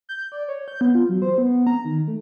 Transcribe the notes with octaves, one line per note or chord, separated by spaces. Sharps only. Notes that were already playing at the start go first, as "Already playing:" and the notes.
G6
D5
C#5
G6
B3
F4
F#3
C5
B3
A#5
D#3
A3